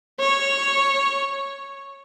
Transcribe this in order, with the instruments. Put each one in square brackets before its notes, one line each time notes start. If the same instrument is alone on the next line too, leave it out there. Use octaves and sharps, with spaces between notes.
[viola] C#5